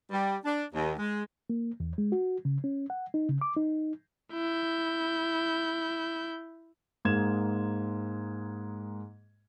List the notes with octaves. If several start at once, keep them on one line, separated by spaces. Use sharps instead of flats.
G3
D4
D#2
G#3
A#3
E2
G#3
F#4
C#3
C#4
F#5
D#4
C#3
D6
D#4
E4 G6
G#2 G#3 A#3 G#6 E7